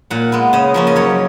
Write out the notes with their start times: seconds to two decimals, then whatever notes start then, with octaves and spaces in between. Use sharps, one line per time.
0.11 A#2 F#5
0.32 G#3 B3
0.53 C#3 D#5
0.74 F3 A#3 C#4
0.87 D#5
0.96 F#2 C#5